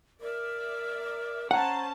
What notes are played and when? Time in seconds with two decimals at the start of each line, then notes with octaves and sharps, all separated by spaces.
0.21 A#4 D5 E5
1.51 C#4 C5 F#5 A5 A#5